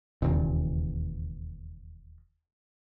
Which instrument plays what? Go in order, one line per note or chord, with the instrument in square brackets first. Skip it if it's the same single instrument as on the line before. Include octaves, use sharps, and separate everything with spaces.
[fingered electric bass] E1 D#2 C#3